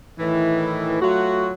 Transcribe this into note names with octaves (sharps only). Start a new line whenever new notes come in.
A2 D#3 E3
F#3 A3 F4 F#4